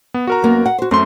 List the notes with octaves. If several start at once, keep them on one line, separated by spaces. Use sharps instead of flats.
B3
F#4 A#4 A#5
F#2 A#3 B3
F#5
F#4 C5
F#2 A3 C4 C6